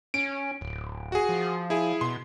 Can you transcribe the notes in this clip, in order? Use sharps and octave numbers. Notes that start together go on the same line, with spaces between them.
C#4 D7
D1
F#4 G#4
F3
E4 G#4
B2 C6